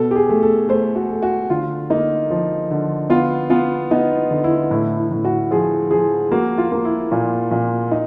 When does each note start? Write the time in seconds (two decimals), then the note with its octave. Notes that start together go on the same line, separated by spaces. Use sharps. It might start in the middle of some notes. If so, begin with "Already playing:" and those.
Already playing: B2 A4
0.11 G4
0.16 G#4
0.29 A3
0.43 A4
0.69 A3 C5
0.96 F#4
1.10 A3
1.22 F#4
1.50 D3 F4
1.90 A#3 D#4
2.31 F3
2.71 D3
3.10 B3 F4
3.50 B3 F4
3.91 B3 D#4
4.30 D3
4.44 E4
4.71 A2 E4
4.97 E4
5.11 A2
5.25 F#4
5.51 F3 G#4
5.91 F3 G#4
6.32 A#3 F#4
6.58 F4
6.72 A#3
6.85 E4
7.12 A#2
7.51 A#2
7.91 D#4